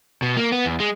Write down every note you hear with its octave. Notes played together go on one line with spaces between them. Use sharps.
B2
A#3
B3
E2
G#3